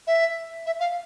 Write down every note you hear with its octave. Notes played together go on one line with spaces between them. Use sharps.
E5
E5
F5